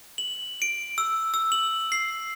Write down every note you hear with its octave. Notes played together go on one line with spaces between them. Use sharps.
F#7
D7
E6
E6
F#7
C7